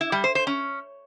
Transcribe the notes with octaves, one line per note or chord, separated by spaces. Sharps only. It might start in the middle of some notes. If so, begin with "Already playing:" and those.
E4
G3
C5
C5
C#4